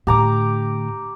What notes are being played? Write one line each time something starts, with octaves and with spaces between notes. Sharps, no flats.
A2 D3 G4 A#5 D6